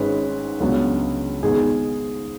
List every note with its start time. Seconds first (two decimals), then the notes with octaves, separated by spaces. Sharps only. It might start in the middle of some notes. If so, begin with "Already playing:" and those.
Already playing: G#1 G#2 G#3 C#4 B4
0.60 C#2 C#3 F#3 B3 D4
1.43 G#1 G#2 G#3 B3 G#4